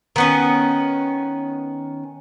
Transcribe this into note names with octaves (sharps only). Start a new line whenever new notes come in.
D#3 B3 C#4